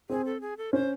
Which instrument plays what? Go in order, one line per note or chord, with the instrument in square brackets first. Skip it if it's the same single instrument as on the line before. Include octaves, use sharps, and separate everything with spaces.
[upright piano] C4 [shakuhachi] G#4
[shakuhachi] A4
G#4
A4
[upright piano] C#4 [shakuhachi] C5